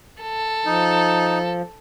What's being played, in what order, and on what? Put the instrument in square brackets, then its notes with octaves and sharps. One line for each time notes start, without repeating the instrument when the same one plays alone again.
[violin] A4
[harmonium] F3 [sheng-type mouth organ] D#4